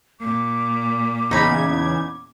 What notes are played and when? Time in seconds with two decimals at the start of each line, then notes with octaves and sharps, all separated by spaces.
0.20 A#2 D6
1.31 E2 C#3 D#4 B5 G#6